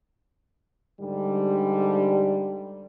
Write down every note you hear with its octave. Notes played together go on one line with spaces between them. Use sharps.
G#2 D3 G3